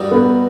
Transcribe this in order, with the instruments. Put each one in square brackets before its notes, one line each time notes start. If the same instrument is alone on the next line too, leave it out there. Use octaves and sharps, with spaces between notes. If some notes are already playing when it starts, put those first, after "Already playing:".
Already playing: [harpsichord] G2 E3 G3 D#4 F#4
[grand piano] B3